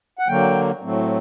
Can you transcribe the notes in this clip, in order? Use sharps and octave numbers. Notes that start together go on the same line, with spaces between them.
F#5
D3 F#3 A#3 G5
A2 F#3 A3 C4